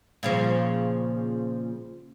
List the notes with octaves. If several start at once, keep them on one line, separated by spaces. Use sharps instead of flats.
A#2 C#3 F3